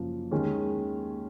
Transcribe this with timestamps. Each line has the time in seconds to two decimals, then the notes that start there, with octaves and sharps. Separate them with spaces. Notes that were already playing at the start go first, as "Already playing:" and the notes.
Already playing: F#1 F#2 F3 A#3
0.31 D#2 D#3 G#3 C#4